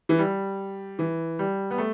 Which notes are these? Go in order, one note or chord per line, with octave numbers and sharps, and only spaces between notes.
E3
G3
E3
G3
B3
A3